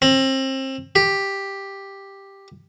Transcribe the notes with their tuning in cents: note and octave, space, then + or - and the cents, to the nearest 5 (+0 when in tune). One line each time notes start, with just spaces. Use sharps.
C4 +30
G4 +5